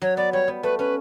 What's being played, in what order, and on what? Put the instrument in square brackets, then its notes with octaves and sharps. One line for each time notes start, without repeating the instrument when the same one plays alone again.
[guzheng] F#3 [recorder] C#5
[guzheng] B3 [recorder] D5
[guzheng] G3 [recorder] C#5
[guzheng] B3
[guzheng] A3 [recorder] B4
[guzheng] C#4 [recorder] B4